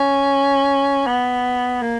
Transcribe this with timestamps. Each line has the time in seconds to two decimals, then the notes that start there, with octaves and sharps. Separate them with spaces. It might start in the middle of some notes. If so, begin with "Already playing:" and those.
Already playing: C#4
1.07 B3
1.82 A#3